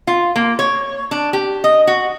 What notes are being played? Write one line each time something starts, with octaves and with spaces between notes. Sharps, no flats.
F4
A#3
C#5
D4
G4
D#5
F#4